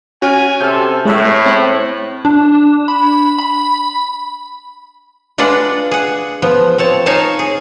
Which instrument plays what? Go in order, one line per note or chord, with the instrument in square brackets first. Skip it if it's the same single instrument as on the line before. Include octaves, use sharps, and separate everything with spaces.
[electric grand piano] C#4 C#5 F6 [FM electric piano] F#4 [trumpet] G#5
[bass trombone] C3 [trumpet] A4 [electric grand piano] F6 G6
[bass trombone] A2 [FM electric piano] G#3 B4 E5 [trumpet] C#5
[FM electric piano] C4 F#6
[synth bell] D4
B5
B5
[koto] G#3 D4 F4 B4 D5 F#5
G#4 F#5
F3 B3
C4 C#5 A5
D#4 C#5 F5 G#5 A5
G#4